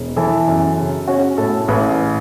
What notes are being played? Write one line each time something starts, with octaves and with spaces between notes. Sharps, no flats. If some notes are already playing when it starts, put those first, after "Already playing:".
Already playing: E1
E3 A4
F#2
C#3
C#4 F#4
A2 A4
A1 B4